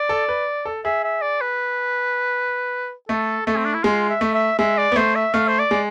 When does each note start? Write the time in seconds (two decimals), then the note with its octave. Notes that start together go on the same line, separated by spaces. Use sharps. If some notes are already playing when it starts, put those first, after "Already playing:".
Already playing: D5
0.09 A4
0.29 B4
0.65 A4
0.85 G#4 E5
1.04 E5
1.22 D5
1.41 B4
3.09 A3 A4
3.46 A3 A4
3.56 C4
3.65 D4
3.74 E4
3.83 G#3 F4
4.09 E5
4.21 A3
4.34 E5
4.59 G#3 E5
4.78 D5
4.92 B3
4.96 A3 C5
5.15 E5
5.33 A3 F5
5.48 C5
5.59 D5
5.71 G#3